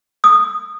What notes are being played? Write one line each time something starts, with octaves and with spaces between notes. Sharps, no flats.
D#6